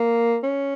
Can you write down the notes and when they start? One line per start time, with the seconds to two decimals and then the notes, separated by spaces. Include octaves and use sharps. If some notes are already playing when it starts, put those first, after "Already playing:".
Already playing: A#3
0.43 C#4